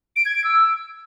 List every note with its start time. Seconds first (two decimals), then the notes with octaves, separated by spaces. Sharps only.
0.16 D7
0.26 G#6
0.35 D7
0.44 E6